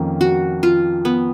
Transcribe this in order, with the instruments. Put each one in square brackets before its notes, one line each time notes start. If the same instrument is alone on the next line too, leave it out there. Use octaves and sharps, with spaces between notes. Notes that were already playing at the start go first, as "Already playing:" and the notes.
Already playing: [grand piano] F2 D#3 A#3 C#4
[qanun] F#4
F4
B3